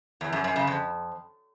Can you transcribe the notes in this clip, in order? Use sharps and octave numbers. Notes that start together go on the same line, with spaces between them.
E2
F#2
F#2
C#3
F2